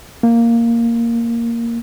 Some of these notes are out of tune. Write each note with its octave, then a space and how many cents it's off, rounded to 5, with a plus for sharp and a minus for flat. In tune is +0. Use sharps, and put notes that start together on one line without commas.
A#3 -5